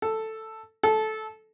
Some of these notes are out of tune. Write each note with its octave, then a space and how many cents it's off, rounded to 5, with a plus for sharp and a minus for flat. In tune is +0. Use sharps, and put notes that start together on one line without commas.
A4 +5
A4 -15